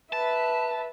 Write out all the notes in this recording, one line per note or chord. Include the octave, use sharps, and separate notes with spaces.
B4 E5 A5